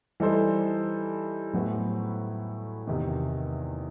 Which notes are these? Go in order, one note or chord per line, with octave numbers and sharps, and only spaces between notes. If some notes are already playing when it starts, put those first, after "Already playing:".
E3 G3 D#4 A4 C5
A2 F#3 B3 F#4 C5
E2 C3 D#3